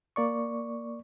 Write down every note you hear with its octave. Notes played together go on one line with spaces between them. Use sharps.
A#3 D5 C#6